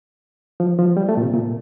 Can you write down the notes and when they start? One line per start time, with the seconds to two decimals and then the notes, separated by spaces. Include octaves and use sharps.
0.60 F3
0.79 F3
0.97 G3
1.09 A3
1.17 A#2
1.22 C3
1.34 A#2